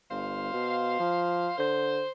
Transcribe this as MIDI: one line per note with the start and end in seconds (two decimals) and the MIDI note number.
0.10 0.51 31
0.10 1.56 72
0.10 1.56 77
0.53 0.99 47
1.00 1.49 53
1.58 2.02 50
1.58 2.10 72